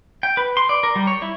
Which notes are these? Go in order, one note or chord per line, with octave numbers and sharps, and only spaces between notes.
G5
B4
C6
D5
A#4
G3
C#5
E4